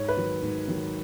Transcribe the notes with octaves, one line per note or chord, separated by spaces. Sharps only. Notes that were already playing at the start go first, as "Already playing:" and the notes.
Already playing: G#2 C#5
B4
D#3 F#3
G#2
D#3 F#3